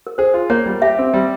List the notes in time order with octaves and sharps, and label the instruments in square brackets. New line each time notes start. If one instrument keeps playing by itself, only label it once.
[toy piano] A#4
[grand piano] G#4 [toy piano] C5
[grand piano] F4
[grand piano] A#3 [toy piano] C#5
[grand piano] G3
[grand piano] G4 [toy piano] E5
[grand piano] C4
G3